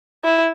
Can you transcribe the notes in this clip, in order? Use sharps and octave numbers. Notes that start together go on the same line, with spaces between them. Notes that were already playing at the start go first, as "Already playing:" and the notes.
E4